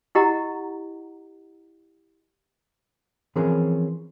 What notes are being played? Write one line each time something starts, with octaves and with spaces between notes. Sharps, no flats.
E4 G4 D#5 F#5 A#5
E3 F3 C4 C#4 G#4 A#4